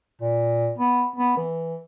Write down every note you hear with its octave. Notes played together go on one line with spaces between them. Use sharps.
A#2
B3
B3
E3